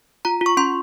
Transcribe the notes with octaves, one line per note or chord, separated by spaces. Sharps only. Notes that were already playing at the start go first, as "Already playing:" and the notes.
F4 A#5
F4
C#6
C#4 C6